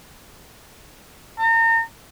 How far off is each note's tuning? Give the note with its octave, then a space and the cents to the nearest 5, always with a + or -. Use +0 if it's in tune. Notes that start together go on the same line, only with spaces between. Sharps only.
A#5 -35